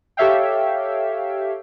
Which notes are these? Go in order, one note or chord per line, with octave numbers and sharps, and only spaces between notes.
G4 A4 C#5 E5 F5 G5